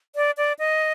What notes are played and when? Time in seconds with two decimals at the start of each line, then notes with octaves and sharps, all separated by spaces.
0.16 D5
0.37 D5
0.59 D#5